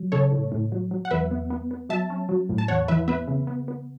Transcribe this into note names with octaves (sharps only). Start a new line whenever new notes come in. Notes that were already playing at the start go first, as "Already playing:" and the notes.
Already playing: F#3
C#3 A4 C#5
A2
A2
F#3
F#3
F#5
E2 B4 E5
B3
B3
B3
F#3 E5 A5
C#4
F#3
A2
A5
E2 C#5 F#5
E3 B4 E5
B3 B4 E5
C#3
B3
B3